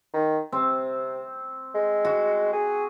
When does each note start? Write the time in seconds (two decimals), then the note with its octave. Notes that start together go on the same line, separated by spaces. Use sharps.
0.14 D#3
0.52 C3 C4
1.75 G#3
2.05 F#4
2.53 G#4